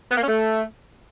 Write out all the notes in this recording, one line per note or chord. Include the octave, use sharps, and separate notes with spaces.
B3
A#3
C#4
A3